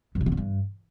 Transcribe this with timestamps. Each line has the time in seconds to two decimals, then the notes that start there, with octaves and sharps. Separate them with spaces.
0.15 F#2
0.21 A#2
0.26 D#3
0.32 D3
0.37 G2